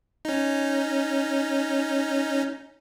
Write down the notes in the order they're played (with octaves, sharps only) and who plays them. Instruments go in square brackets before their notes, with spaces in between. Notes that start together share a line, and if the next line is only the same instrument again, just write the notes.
[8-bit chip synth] C#4 D#4